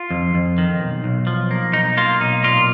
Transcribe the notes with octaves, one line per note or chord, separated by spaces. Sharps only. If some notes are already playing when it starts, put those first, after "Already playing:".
Already playing: F4
F2
F2
D#3
B1
B1
F3
A#3
B1 D#4
A#3 F4
B1 D#4
A#2 F4